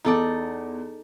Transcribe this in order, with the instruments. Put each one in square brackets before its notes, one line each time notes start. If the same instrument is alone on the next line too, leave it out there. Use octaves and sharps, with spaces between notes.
[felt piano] E2 [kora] D#4 A4 D5